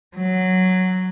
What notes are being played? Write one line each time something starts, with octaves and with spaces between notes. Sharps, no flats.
F#3